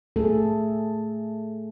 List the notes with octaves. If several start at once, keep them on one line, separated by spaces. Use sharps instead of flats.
A3 G#4 A4